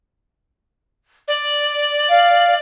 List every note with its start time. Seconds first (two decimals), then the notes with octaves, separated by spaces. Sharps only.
1.28 D5
2.11 F5